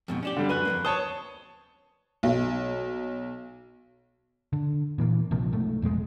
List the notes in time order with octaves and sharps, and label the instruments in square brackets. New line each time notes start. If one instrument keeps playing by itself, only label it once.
[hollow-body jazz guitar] F2 G#2 B2
C#4 D4 G4
[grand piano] D3 G3
[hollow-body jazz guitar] F#2 C#4 F#4 [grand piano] B4 F#6
[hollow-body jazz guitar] F2 G#2 A#3
[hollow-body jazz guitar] C5 [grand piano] C#5 A5 D#6
[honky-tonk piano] B1
[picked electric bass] D3
A#2 E3 A#3
A#1 C3 F3 A#3
B1 G#2 A3
F1 B1 B2 G#3